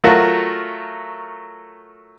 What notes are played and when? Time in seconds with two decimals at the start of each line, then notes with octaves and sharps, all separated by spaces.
0.04 F#3 A3 F4 F#4 A#4